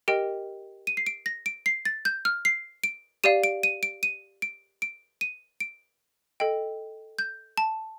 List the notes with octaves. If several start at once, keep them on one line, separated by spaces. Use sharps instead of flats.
G4 A#4 D#5 G5 D7
D#7
C7
D7
A#6
D7
C7
A6
G6
F6
C7
D7
G4 D5 F5 D#7
D7
D#7
D7
D#7
D7
D7
D#7
D7
A4 D#5 G5
G6
A5